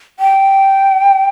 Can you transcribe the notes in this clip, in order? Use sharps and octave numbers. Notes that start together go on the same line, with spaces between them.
G5